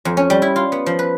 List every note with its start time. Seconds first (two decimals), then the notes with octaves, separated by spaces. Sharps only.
0.05 F2
0.17 C#4
0.30 G3
0.42 E4
0.56 F4
0.72 B3
0.86 F3
0.99 B4